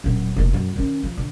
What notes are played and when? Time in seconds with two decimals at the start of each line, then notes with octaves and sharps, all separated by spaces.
0.04 D#1 F#3
0.36 F1 A#3
0.53 F#2 F#3
0.76 D#3 C#4
1.03 F3
1.18 D3